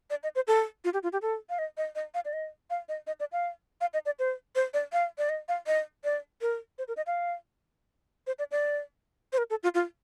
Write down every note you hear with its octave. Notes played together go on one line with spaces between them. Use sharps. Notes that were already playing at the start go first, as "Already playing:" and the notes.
D5
D#5
C5
A4
F4
G4
F4
G4
A4
F5
D#5
D#5
D#5
F5
D5
D#5
F5
D#5
D#5
D5
F5
F5
D#5
D5
C5
C5
D5
F5
D5
D#5
F5
D#5
D5
A#4
C5
A#4
D#5
F5
C5
D5
D5
C5
A#4
A4
F4
F4